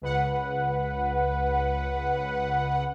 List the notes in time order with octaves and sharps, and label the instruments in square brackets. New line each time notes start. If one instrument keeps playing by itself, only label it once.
[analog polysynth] C#2 B4 F#5